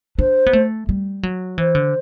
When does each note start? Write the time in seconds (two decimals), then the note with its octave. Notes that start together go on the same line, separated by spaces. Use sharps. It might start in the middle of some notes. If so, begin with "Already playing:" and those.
0.18 D4 C5
0.46 B3
0.53 A3
0.89 G3
1.23 F#3
1.57 E3 C5
1.75 D3